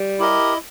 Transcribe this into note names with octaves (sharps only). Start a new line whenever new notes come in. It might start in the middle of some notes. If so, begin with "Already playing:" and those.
Already playing: G3
E4 G4 A#4 D#5